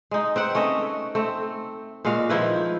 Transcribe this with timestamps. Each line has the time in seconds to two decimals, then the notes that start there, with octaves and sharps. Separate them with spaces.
0.11 G#3 D#4
0.36 C4 B4 F#5
0.55 A3 C#4 D#5
1.15 A3 C4
2.05 A#2 G#3 F#4 F5
2.29 D#3 F3 E4 B4